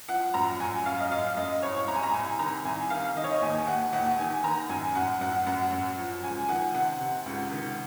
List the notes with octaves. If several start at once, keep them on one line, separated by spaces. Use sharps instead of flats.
F3 F#5
F#2 A#5
F#2 G#5
F#2 F5
D#5
F#2 F5
F#2 D#5
C2 C#5
C2 A#5
G#5
A#5
C2 G#5
D#3 A#5
C2 G#5
D#3 F5
D#3 D#5
C#5
D#5
D#2 G#5
D#2 F#5
D#2 F#5
D#3 G#5
D#3 A#5
F#2 G#5
F#2 F#5
F#2 F#5
F#2 F#5
F#2
F3
C#2 G#5
G#5
D#3 F#5
C3 F#5
C3
C#2
D#3